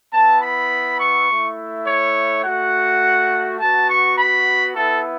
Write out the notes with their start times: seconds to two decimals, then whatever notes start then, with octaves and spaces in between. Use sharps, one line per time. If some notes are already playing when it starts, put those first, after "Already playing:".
0.12 B3 E4 A5
0.41 B5
0.99 C#6
1.29 A3 E4
1.87 C#5
2.44 A3 F#4 F#5
3.60 B3 F#4 A5
3.89 C#6
4.18 B5
4.75 B3 E4 A4